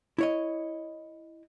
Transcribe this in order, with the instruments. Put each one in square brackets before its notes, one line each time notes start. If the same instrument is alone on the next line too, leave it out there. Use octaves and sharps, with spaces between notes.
[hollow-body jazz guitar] E4 C#5 D#5